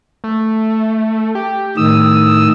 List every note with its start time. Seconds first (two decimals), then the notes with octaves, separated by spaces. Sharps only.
0.24 A3
1.35 G4
1.77 A2 D#3 D#6 E6